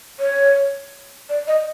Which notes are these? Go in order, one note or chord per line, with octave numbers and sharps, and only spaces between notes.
C#5
D5
D#5